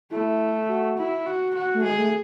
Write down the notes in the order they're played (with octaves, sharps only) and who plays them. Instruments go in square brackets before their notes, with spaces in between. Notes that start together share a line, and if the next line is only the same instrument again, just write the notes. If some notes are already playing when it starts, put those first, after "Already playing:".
[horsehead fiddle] A3 [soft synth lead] E4
[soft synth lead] F#4
[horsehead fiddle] E4
F#4
F#4
[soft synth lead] A3
[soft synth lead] G#3 [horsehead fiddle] G#4
[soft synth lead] A3